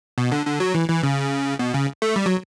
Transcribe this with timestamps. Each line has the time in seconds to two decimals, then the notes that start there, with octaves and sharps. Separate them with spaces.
0.18 B2
0.32 D3
0.46 D3
0.60 F#3
0.74 E3
0.88 E3
1.03 C#3
1.59 B2
1.74 C#3
2.02 A3
2.16 G3
2.26 F#3